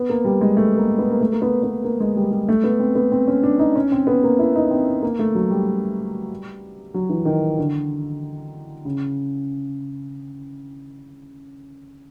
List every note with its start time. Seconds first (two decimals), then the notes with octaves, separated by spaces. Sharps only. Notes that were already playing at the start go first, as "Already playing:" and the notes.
Already playing: B3
0.09 A#3
0.25 G3
0.41 G#3
0.57 A3
0.78 A#3
0.99 B3
1.11 A#3
1.21 A3
1.32 A#3
1.42 B3
1.63 B3
1.84 A#3
2.00 G#3
2.16 G3
2.31 G3
2.48 A3
2.64 B3
2.80 C4
2.95 B3
3.12 C4
3.27 C#4
3.43 D4
3.59 D#4
3.76 C#4
3.92 C4
4.07 B3
4.24 A#3
4.39 E4
4.56 D#4
4.71 C4
5.02 A#3
5.19 A3
5.35 F#3
5.50 G3
6.94 F#3
7.10 E3
7.25 D#3
7.58 D3
8.85 C#3